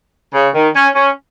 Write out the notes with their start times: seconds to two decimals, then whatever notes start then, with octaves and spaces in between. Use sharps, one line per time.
0.34 C#3
0.55 D#3
0.75 C#4
0.96 C#4